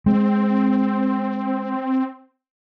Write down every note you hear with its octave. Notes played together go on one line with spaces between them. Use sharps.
G#3 C4